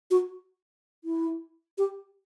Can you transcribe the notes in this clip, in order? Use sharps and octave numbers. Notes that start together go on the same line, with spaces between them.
F#4
E4
G4